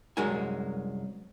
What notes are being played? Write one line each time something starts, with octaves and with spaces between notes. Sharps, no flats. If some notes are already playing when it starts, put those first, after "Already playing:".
C2 F#2 G#3 F#4 A#4 G#5